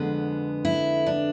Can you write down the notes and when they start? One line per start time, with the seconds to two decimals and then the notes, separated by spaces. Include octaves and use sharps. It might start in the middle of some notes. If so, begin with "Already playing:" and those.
Already playing: F2 D3 G#3 B3
0.65 E4
1.06 D4